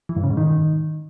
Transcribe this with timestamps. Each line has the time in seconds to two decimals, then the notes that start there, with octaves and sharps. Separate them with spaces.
0.09 E3
0.16 G2
0.23 C#3
0.30 G#2
0.37 D#3